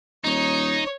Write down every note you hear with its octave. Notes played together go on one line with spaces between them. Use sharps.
D#1 D#4 C#5